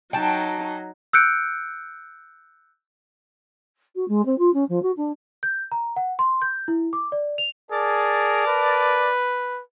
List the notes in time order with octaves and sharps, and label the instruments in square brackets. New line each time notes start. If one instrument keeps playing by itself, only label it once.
[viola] F#3 D#4 [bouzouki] G5 A5
[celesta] E6 F#6 G6 C#7 D7
[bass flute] F#4
G#3
C4
F4
C#4
F3
F#4
D4
[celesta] G6
A#5
F#5
C6
G6
E4
D6
D5
F7
[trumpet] G#4 [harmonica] A#4 D5 A5
[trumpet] B4